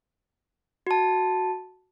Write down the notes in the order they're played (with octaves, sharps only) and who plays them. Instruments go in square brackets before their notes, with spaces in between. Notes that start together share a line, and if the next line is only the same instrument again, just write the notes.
[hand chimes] F#4 A5